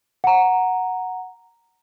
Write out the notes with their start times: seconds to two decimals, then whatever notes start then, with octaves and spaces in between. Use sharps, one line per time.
0.24 F#5 A#5